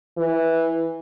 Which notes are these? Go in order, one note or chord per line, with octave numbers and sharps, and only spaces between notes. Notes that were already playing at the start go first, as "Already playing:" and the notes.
E3